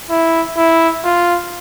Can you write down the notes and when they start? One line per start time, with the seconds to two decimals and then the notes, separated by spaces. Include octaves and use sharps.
0.10 E4
0.57 E4
1.04 F4